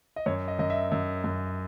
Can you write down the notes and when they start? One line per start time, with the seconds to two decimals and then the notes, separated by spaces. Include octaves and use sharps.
0.16 D#5
0.26 F#2 C#5
0.48 D#5
0.59 F#2 D#5
0.70 E5
0.92 F#2
1.24 F#2